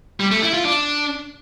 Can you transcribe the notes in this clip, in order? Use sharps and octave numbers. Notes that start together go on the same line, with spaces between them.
G3
A3
E4
F4
D4